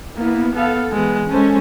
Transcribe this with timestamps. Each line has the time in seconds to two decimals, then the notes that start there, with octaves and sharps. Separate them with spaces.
0.17 A#3 B3 E4
0.55 B3 A4 F5
0.92 E3 G#3 B3
1.30 G#3 C#4 A4 C5